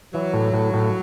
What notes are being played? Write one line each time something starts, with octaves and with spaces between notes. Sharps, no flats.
E3 F#3
A2
A2
A2